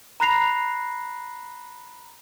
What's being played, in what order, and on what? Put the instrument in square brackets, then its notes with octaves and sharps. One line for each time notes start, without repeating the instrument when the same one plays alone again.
[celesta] A#5 B5 F#6 A#6 C7 F7